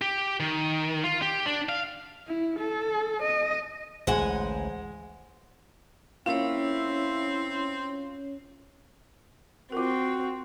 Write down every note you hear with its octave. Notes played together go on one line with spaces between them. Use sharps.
G4
D#3
F4
G4
D4
F5
E4
A4
D#5
A1 D2 G#3 C5 F#5 G#5
A#3 C4 C#4 E4 F4 C#5
C4 F4 F#4 A#4